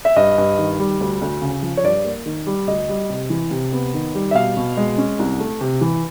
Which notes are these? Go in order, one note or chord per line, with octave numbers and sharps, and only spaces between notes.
E5
G2 D#5
G2
D#3
G3
D2
D2
C#3
F3
C#5
G2 D5
A#3
D#3
G3
D2 D#5
G3
C3
E3
C3
B3
D#3
G3
E5
B2 F5
B2
G#3
C#4
C2
A3
C3
E3